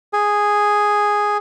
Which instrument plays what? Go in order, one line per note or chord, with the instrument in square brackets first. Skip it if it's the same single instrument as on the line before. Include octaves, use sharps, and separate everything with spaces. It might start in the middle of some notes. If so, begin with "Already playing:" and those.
[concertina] G#4